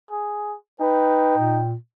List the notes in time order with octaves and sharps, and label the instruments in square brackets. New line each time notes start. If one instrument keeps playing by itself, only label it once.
[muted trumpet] G#4
[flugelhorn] D#4 [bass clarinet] B4 [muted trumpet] G5
[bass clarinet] A#2